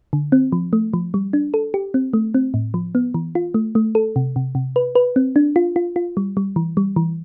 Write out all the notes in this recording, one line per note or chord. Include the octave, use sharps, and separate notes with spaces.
D3
C4
F3
A3
F3
G3
D4
A4
G4
C4
A3
C4
A2
F3
B3
E3
F4
A3
A3
A4
C3
C3
C3
B4
B4
C4
D4
F4
F4
F4
G3
G3
E3
G3
E3